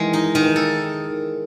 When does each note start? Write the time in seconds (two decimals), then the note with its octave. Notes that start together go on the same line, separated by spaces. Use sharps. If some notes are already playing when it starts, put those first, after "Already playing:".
Already playing: D#3 E3 G#3
0.13 D#4
0.35 D#3
0.56 A4